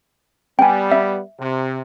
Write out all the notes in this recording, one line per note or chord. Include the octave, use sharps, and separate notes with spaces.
G3 B3 G5 G#5
E5
C3